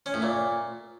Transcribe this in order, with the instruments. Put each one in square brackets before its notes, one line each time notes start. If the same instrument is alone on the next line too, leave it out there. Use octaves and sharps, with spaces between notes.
[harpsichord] C#4
A2
A#2